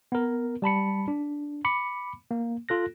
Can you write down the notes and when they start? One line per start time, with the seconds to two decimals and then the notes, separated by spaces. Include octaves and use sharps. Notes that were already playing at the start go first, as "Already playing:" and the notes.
0.12 B3 A#4
0.62 G3 A5 B5 C#7
1.08 D4
1.65 B5 D6 C#7
2.31 A#3
2.69 F4 A4 F#6 A#6